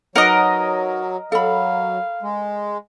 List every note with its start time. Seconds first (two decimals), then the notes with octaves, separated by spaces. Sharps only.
0.16 F#3 D#4 A#4 B4 C#5 D#5 F#5
1.32 F#3 A4 F5 B5
2.22 G#3